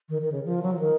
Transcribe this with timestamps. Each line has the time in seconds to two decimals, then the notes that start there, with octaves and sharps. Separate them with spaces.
0.09 D#3
0.22 D#3
0.32 C#3
0.45 F3
0.62 F#3
0.73 F3
0.80 D#3